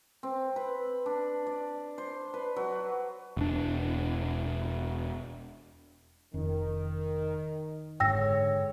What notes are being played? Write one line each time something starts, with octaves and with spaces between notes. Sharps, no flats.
C4
B4
D4
D5
C5
B4
F#3
E1 D4
F1 D#3 C#4
F#1 G#2 D3 G#3 C#5 G5 E6 A#6